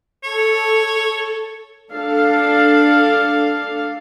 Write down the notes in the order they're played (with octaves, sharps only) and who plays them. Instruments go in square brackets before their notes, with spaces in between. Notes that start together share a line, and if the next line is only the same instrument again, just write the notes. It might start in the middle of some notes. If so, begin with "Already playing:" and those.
[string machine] A4 [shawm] C#5
[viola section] D4 A4 F5